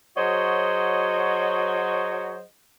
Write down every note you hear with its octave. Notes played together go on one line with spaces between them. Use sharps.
F#3 F#4 G#4 C5 C#5 D#5